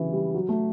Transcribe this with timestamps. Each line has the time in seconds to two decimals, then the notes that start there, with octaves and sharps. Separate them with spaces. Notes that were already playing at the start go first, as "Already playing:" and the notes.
Already playing: C#3 E3 F#3 G3
0.13 G3
0.34 F#3
0.49 A3